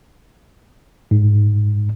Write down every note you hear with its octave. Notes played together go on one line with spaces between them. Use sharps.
G#2